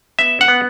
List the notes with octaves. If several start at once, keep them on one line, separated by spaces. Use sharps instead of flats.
B3 E5
F#5
B3